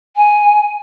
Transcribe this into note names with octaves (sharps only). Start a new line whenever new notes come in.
G#5